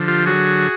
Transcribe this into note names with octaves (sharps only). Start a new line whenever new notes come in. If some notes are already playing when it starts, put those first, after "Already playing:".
Already playing: D3 F3
F4 G4
F#3 F#4 G#4